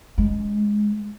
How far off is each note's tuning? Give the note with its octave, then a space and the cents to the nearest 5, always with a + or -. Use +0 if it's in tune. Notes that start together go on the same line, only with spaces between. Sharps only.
G#3 +0 C#4 +30